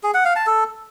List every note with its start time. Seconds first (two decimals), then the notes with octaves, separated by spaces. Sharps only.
0.03 G#4
0.14 F#5
0.25 F5
0.36 A5
0.47 A4